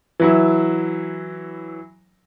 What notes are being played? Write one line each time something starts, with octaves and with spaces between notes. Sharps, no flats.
E3 F#3 E4